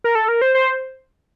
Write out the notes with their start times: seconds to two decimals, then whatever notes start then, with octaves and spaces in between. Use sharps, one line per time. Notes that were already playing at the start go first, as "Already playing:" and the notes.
0.04 A#4
0.15 A4
0.28 A#4
0.42 C5
0.55 C5